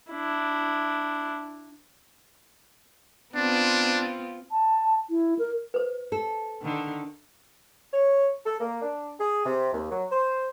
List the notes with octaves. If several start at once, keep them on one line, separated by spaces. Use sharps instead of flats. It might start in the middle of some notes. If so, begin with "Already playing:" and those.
D4 E4
B3 C4 D4 F4
A5
E4
A#4
B4 C5
A4
D3 D#3
C#5
A4
A#3
D4
G#4
C3
D#2
F#3
C5